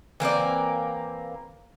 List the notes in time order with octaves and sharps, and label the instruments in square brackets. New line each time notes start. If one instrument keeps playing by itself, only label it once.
[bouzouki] E3 A#3 C4 D5